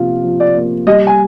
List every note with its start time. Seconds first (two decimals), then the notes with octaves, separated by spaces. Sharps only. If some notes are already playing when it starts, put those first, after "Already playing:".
Already playing: C3 F3 A#3 F4
0.24 F3
0.40 D5
0.56 A#3
0.87 G3 D#5
1.07 G#5